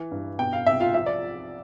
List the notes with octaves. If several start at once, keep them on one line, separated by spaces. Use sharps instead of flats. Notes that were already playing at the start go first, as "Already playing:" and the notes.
Already playing: E3
G2
B2 G5
F5
C2 E5
F4 F5
F3 E5
D5